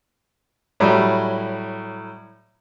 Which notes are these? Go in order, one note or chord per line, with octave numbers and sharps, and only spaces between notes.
A2 F#3 G3